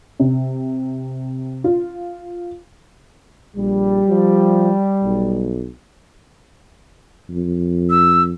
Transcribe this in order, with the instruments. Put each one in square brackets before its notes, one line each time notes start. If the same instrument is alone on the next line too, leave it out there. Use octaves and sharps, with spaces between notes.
[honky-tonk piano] C3
F4
[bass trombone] A#1 [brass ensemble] G3
[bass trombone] F3
B1
[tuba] F2
[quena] E6